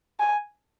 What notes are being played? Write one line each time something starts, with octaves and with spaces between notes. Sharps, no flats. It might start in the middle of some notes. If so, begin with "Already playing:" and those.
G#5